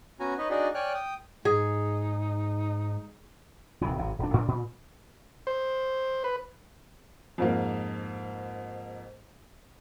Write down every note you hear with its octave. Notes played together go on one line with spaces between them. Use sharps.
B3 C#4 F#4 G#5 A#5
D#4 B4 C#5 D#5
D4 D#4 F#4 G#4 D5 D#5
C#5 D5 G5 G#5 F6 F#6
G5 D#6
G#2 D#4 G#4
D#1 C3 D#3 E3
G#1 C3
D#1 D4
A2 C4 D4
A#2
C5
B4
F2 G#2 A#3